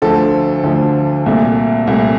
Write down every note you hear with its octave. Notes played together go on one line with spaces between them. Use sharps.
D2 D3 F3 A4
D2 D3 F3
C2 A#2 A3
C2 A#2 A3